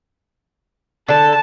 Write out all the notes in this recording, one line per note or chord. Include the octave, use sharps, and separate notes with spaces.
D3 A4 A5